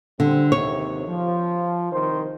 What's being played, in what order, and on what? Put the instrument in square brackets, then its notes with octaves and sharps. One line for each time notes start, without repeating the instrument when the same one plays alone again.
[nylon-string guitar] D3 [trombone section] G3 C4
[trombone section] D#2 G#2 C3 [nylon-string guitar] C#5
[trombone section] F3
C2 D#3 C5